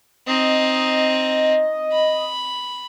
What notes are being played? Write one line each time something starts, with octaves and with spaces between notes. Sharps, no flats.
C4 D#4 D#5
B5